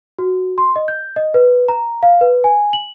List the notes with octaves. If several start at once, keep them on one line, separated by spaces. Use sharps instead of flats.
F#4
C6
D#5
G6
D#5
B4
A#5
F5
B4
G#5
F#7